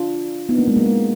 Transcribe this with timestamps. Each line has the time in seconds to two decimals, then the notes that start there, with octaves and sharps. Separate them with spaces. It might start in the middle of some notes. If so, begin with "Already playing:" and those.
Already playing: D4 F4
0.49 B3 D#4
0.58 A#3 D4
0.68 G#3 B3
0.77 F#3 A#3
0.86 G#3